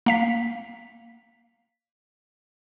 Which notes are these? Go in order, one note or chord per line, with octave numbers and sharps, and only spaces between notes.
A#3 F5 B6